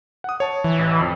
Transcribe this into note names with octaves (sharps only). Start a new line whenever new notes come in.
F#5 D#6
C#5 A5
E3
A1
F2